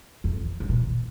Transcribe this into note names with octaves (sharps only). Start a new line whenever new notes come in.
F2
G2
A#2